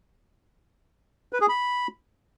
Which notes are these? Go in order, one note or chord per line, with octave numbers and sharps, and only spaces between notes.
B4
G#4
B5